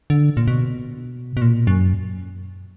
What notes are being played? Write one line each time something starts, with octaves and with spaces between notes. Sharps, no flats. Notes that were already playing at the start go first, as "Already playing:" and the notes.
D3
A#2
B2
B2
A#2
F#2